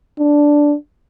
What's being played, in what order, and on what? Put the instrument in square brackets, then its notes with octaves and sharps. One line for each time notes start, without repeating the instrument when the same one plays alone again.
[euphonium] D4